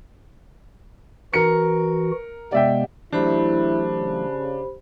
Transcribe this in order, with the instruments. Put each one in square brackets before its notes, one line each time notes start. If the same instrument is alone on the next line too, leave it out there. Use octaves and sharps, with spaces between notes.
[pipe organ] E3 F#4 [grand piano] A#4 C#7
[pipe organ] C3 G#3 B3 [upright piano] D5 E5 G5
[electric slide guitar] E3 F#3 A3 [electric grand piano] D4 [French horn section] E4 [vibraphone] G4 C5 B5
[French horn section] C#3